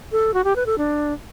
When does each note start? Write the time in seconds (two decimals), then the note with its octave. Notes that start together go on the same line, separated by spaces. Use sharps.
0.12 A4
0.34 F#4
0.44 G4
0.56 B4
0.66 A4
0.78 D4